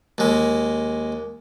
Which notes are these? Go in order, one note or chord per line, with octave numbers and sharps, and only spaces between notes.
D#2 G#3